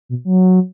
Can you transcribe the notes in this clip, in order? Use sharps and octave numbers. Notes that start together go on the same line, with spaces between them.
B2
F#3